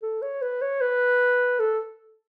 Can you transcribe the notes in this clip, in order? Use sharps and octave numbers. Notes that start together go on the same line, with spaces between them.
A4
C#5
B4
C#5
B4
A4